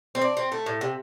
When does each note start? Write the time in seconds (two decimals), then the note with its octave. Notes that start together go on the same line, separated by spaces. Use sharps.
0.15 C4
0.21 D4
0.37 C4
0.52 A3
0.66 A2
0.81 C3